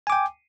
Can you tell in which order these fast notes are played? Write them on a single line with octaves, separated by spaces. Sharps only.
G#5 D6 G5